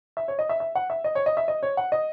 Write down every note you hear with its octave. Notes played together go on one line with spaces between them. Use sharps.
E5
C#5
D#5
E5
E5
F#5
E5
D#5
C#5
D#5
E5
D#5
C#5
F#5
D#5